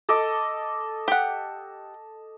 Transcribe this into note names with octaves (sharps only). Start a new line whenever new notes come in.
A4 D#5 D6
G4 F#5